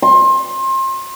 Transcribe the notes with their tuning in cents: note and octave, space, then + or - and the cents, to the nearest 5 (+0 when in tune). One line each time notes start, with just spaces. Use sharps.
C6 +30